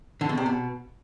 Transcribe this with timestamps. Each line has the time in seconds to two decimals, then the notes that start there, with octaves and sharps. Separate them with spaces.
0.21 D3
0.29 B2
0.37 C3
0.46 B2